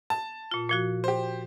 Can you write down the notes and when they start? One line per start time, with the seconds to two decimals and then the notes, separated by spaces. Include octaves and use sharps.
0.10 A5
0.51 A#2 F4
0.69 A#2 F3 F#4
1.04 G4 C5